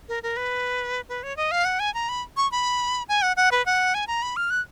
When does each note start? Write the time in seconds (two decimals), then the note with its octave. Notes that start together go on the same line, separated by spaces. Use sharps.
0.09 A#4
0.23 A#4
0.37 B4
1.09 B4
1.23 C#5
1.37 D#5
1.51 F5
1.65 F#5
1.80 G#5
1.94 A#5
2.09 B5
2.37 C#6
2.52 B5
3.09 G#5
3.22 F#5
3.37 F#5
3.52 B4
3.66 F#5
3.94 G#5
4.08 A#5
4.22 B5
4.36 F6
4.50 F#6